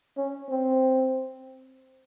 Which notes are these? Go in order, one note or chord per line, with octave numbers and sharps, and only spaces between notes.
C#4
C4